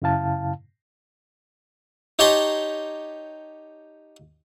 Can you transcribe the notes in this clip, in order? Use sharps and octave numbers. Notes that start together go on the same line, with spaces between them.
F#2 C#3 E4 F5 A5
D#4 G4 C#5 A5 A#5 C6